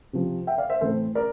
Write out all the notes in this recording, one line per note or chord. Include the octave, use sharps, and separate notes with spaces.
C3 F3 C4
E5 G5
D5 F5
C5 E5
A2 E3 A3 C4 A4 C5
A#4 D5